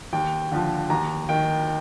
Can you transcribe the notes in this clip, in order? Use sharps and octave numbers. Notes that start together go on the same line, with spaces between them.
D#2 G5
D3 F3
D#2 A#5
D#3 G5